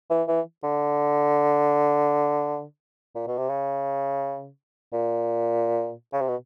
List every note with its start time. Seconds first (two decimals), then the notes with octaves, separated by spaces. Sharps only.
0.10 E3
0.28 E3
0.63 D3
3.15 A#2
3.27 B2
3.38 C3
3.49 C#3
4.93 A#2
6.13 C#3
6.21 C3
6.28 B2